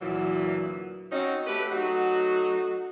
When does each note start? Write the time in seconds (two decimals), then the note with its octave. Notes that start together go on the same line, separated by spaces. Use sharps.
0.02 D2 A#2 E3 F#3
1.12 C4 C#4 D#4 F#4 D#5
1.47 A3 G4 B4
1.72 F#3 A3 D#4 F#4